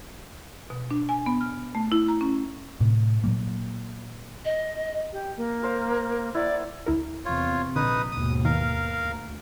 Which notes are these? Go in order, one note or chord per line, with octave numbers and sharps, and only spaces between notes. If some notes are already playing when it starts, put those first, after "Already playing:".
B2
D4
G#5
B3
F6
A3
E4
A#5
C#4
A2 C3
A#2 F#3 A#3
D#5
G4
A#3
A#4 C5 F5
E4 D5 F#5
D2 E4 A#4
E2 C3 C4 F4 C#5
A#1 D3 D#4 B4 D#6
D#2 G#2 B2 D#6
D#3 A#4 F5
D2